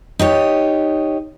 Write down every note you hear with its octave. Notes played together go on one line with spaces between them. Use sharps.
D#4 G4 C#5